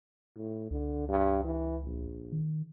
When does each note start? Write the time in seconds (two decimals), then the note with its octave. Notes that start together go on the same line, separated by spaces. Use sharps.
0.36 A2
0.71 C#2 D3
1.08 G2
1.44 E3
1.84 A#1
2.32 D#3